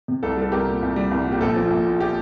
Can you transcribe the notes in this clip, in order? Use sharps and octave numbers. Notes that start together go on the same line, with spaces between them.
C3
C2 A4
G3 A4
C2 G4 A#4
A#2
C2
G3
C2
A#2
G4
A#1 A4
F3
A#1
A#2
G4